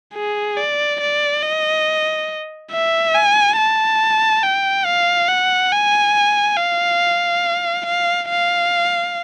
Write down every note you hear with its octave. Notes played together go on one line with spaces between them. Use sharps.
G#4
D5
D5
D#5
E5
G#5
A5
G5
F5
F#5
G#5
F5
F5
F5